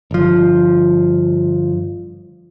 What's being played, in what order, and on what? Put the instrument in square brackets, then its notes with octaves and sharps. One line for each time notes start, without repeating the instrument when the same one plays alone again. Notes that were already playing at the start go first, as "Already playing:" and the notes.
[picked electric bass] G1 F3